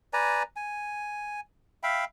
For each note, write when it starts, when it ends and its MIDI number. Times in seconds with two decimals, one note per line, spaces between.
0.13 0.43 71
0.13 0.43 74
0.13 0.43 80
0.13 0.43 82
0.56 1.40 80
1.83 2.05 76
1.83 2.05 77
1.83 2.05 79
1.83 2.05 83